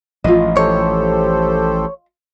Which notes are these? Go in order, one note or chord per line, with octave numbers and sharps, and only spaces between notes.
A1 F3 F4 D#5
G4 A4 C5 C#5